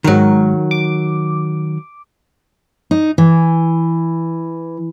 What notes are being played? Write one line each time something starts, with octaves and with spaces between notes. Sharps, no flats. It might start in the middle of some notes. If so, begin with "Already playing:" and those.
G#2 D#3 F#3 A#4
D6
D#4
E3